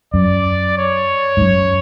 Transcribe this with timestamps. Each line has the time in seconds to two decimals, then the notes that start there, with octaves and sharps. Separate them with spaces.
0.14 F#2 D5
0.79 C#5
1.37 G#2
1.41 F#2